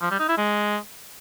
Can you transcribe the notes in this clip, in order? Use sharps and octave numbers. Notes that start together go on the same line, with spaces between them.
F3
G3
D#4
E4
G#3